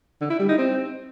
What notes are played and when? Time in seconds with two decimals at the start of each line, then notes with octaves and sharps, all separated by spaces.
0.21 D3
0.30 E4
0.39 G3
0.49 D#4
0.58 C4